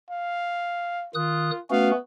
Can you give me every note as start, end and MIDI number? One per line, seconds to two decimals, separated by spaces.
0.10 1.08 77
1.15 1.51 51
1.15 1.60 65
1.15 1.51 87
1.15 1.51 90
1.70 1.91 57
1.70 1.97 59
1.70 1.91 61
1.70 1.91 66
1.70 1.91 77